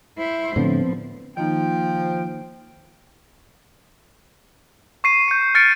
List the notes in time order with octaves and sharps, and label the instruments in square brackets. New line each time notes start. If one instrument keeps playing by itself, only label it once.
[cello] E4 C5
[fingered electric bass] A2 D3 [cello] F3 [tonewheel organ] B3 C4
[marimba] D#3 A#3 D#4 [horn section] F3 [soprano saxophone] G5
[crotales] C#6 C7 D#7
G6 C#7
F6 A6 C#7 D7